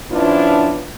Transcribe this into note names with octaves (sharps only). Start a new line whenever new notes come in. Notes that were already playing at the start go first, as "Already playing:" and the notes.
F3 B3 C#4 D4 E4 F4